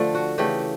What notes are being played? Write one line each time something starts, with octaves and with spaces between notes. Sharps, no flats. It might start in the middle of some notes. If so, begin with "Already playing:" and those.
Already playing: D3 F3 A3
F#4
C#3 E3 A3 G4